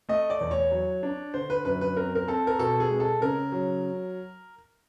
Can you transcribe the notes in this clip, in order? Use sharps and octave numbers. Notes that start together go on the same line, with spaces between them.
A3 D#5
D5
E2
C#5
F#3
D4
D3 C5
B4
F#2 B4
B4
C4 A#4
A#4
C4 A4
A#4
B2 A4
G#4
G#3
A4
C#3 A#4
F#3